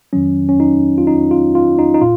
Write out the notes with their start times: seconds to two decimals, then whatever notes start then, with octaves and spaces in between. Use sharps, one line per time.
0.13 F2 D#3 F#3 C#4
0.49 C#4
0.60 D#4
0.98 F4
1.07 D#4
1.31 F4
1.55 F4
1.79 D#4
1.94 D#4
2.01 A#2 F4